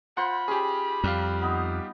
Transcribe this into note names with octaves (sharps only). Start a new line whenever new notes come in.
F4 C5 F#5 B5 C6
C#4 G4 G#4
F2 G3 G4 F5
B3 D#4